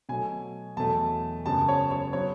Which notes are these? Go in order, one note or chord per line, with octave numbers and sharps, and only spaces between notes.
B2 F#3 A3 G#5
E2 B2 F#3 A3 A5
F#2 C#3 G#3 B3 A5
C#5
C#5
F#3 B3 C#5